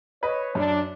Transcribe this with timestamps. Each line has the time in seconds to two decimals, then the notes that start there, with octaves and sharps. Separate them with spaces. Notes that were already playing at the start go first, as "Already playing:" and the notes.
0.23 B4 C#5 D#5
0.55 F#2 D4